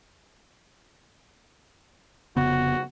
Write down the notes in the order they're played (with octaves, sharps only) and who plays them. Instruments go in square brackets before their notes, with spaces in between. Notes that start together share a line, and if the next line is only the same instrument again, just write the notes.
[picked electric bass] F1 C#3 B3 [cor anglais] F#4